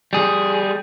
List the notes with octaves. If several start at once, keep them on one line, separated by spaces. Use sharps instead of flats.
G3 G#4